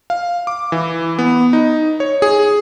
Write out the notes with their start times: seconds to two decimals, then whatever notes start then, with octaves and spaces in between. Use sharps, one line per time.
0.10 F5
0.47 D6
0.72 E3
1.19 B3
1.53 D#4
2.00 C#5
2.22 G#4